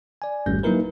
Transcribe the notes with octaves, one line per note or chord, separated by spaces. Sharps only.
D5 G#5
G#1 F2 G3 A3 C#4 G6
F#3 A#3 D#4 E4 A#4 B4